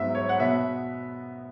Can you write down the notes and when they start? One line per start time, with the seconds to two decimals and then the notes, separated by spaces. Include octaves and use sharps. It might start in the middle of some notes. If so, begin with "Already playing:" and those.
Already playing: G#2 F#3 B3 E5
0.15 C#5
0.29 F#5
0.40 B2 B3 E5